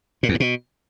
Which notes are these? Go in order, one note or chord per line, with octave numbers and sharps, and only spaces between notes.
A#2
E2
G#2
B2